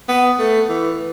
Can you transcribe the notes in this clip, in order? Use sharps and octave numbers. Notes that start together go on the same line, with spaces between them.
B3
A3
E3